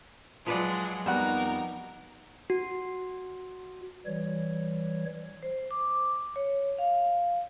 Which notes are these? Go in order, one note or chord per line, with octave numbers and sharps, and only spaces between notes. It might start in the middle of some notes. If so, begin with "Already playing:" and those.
F3 F#3 G#3 B4 D5
F2 G3 B3 D#4 F#4 A#4 F#5
F#4
E3 G3 C#5
C5
D6
C#5
F5